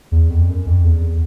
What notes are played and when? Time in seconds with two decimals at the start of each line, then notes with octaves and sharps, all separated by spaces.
0.12 E2
0.30 F2
0.49 F#2
0.67 F2
0.85 E2